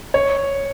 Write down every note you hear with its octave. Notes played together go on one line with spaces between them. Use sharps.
C#5